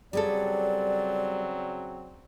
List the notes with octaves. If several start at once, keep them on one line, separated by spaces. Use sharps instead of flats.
C#3 F#3 G3 C4 G#4 A4 D5